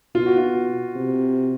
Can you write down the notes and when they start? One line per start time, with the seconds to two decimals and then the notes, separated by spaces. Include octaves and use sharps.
0.15 B2 F4
0.26 F#4
0.37 F4
0.95 C3